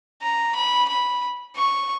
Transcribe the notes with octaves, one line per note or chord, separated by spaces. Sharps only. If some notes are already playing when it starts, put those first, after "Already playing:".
A#5
B5
B5
C#6